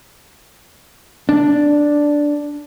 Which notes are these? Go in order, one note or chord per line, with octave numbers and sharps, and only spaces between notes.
D4